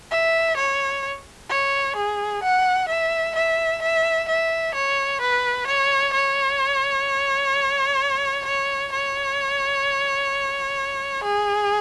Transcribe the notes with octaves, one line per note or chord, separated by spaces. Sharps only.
E5
C#5
C#5
G#4
F#5
E5
E5
E5
E5
C#5
B4
C#5
C#5
C#5
C#5
G#4